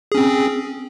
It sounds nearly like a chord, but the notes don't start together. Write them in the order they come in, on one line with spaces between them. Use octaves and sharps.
G#4 C#4 C4